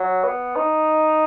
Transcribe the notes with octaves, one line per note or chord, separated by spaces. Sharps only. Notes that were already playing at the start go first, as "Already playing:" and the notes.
Already playing: F#3
B3
D#4